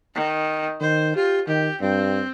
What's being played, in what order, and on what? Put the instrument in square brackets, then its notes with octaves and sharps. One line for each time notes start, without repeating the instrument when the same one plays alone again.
[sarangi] D#3
[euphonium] D#3 [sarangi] C5
[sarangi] F4 [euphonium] G4
[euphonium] D#3 [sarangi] G4
[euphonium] G2 [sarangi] C4